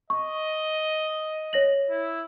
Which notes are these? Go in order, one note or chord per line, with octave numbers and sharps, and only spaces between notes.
D#5 C#6
C#5 A#6 F#7
E4